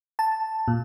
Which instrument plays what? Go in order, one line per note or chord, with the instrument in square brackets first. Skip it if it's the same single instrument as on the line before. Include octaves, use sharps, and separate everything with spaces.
[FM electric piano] A5
A#2